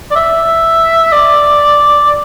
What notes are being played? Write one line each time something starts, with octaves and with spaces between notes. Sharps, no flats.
D5
E5
D5